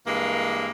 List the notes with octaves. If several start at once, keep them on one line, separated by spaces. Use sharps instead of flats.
G2 E3 G#3 A#3